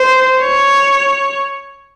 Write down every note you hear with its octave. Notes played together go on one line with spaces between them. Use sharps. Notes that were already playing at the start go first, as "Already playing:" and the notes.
Already playing: C5
C#5